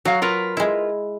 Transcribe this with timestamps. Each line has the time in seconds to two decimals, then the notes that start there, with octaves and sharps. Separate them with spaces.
0.05 F#3 F#4 F5
0.22 F4 A#4 B4
0.57 G#3 E4